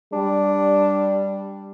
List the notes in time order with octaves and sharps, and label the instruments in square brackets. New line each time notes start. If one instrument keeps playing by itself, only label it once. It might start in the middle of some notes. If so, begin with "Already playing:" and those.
[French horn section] G3 [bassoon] D4